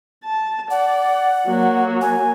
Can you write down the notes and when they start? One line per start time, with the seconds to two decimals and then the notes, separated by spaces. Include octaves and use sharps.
0.24 A5
0.70 D5 F#5
1.46 F#3 A#3
2.01 G#5